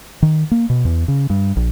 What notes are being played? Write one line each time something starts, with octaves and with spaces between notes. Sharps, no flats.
D#3
A#3
B2
E2
C#3
G2
A#1